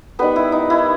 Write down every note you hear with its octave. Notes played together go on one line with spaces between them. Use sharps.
D#3 G3 B3 B4
E4
D#4
E4